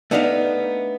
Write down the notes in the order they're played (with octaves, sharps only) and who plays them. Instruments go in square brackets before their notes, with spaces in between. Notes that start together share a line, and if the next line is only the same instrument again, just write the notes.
[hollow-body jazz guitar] A3 B3 D4 D#4 D#5 F5